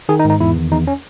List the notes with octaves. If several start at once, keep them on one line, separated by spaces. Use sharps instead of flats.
D#3 G#4
D#4
G#2
D#4
E2 E4
D#3
E2 D#4
C#4